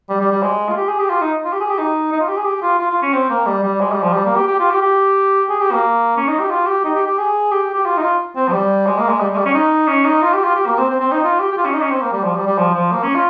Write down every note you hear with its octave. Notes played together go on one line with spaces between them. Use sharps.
G3
G3
G3
G#3
F4
G4
G#4
G4
F4
D#4
F4
G4
G#4
G4
D#4
D#4
F4
G4
G#4
G4
F4
F4
F4
C#4
C4
A#3
G3
G3
G#3
G3
F3
G3
A#3
G4
G4
F4
G4
G4
G#4
G4
A#3
C#4
D#4
G4
F4
G4
D#4
G4
G4
G#4
G4
G4
F4
D#4
F4
C4
F3
G3
G#3
A#3
G#3
G3
G#3
G3
C#4
D#4
C#4
D#4
F4
G4
F4
G4
A#3
C4
C4
C4
D#4
F4
G4
G4
F4
C#4
D#4
C#4
C4
A#3
G3
F3
G3
G3
F3
F3
A#3
C#4
F4